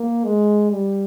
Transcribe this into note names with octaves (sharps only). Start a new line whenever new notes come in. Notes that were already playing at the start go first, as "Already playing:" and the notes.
Already playing: A#3
G#3
G3